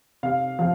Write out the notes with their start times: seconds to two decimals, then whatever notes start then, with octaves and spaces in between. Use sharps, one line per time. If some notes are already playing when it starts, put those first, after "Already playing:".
0.23 C3 F5
0.59 F3 F5